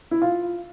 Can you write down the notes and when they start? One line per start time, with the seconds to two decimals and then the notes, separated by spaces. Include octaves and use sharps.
0.11 E4
0.22 F4